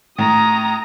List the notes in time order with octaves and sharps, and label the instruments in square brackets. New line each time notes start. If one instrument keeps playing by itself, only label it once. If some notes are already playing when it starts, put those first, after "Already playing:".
[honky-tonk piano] A2 [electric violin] A#5 D#6